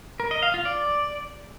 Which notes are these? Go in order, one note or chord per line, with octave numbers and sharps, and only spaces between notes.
A#4
D#5
F5
F4
D5